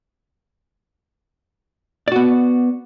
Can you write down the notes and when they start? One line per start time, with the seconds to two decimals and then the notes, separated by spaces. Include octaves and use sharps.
2.08 D5
2.12 F#4
2.16 B3